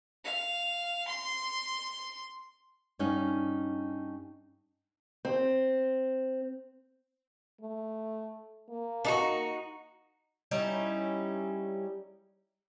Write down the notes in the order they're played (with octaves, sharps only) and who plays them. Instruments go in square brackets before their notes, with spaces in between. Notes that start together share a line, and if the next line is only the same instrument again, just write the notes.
[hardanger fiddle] F5
C6
[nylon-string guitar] G2 C#4 D#4 F5 F#5
[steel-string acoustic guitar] C4
[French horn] A3
A#3
[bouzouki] D4 D#4 F#4
G3 C#4 D#4 E4